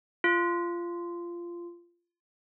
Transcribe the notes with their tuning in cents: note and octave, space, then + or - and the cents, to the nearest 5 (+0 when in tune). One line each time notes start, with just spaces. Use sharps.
F4 -15